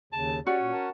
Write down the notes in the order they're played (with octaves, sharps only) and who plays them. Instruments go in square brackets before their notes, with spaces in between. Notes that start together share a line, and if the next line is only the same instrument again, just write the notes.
[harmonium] D#2 C#3 [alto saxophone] A5
[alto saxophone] C#4 [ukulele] F#4 [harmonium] G4 D5
[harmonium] A#2
A#4 F#5 A5